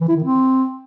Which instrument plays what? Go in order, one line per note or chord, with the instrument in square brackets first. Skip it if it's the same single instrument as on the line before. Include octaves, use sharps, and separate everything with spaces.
[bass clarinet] E3
E4
D#3
C4